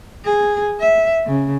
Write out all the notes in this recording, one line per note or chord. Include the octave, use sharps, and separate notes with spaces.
G#4
E5
C#3